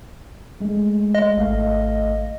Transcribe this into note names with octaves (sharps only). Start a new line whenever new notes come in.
G#3 A3
D#5
G#1 A3 F5